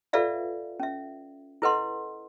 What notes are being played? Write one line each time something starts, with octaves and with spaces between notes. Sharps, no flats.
F4 A4 B4 D5 E5 F5
C#4 E5
E4 A4 B4 D#5 F#5 C6